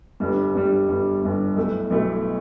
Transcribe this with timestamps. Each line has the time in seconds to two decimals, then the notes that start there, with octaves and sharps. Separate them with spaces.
0.20 G1 G2 G3
0.54 G1 G2 G3
0.88 G1 G2 G3
1.22 G1 G2 G3
1.56 B1 B2 A3 E4
1.90 B1 B2 A3 E4